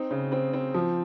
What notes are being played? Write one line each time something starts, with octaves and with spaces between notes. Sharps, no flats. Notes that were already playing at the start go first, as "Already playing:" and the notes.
Already playing: C4 D#4
C#3
C4
C4
F3